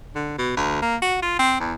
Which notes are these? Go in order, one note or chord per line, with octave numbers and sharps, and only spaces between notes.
D3
B2
D2
A#3
F#4
F4
C4
E2